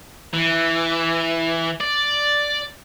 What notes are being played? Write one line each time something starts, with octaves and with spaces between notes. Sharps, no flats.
E3
D5